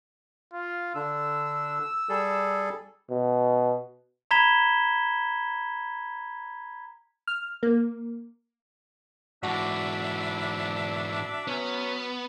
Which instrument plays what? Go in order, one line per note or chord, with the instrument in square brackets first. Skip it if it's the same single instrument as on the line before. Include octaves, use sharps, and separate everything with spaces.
[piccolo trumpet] F4
[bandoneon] D3 D4 [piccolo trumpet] E6
[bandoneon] G3 G#4 A4
[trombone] B2
[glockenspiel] A#5 B5 G#6 B6 E7 G7
[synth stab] F6
A#3
[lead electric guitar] G#2 E3 [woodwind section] D4 [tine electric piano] F#4 [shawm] E5
[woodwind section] F#3 C#4 [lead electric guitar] B3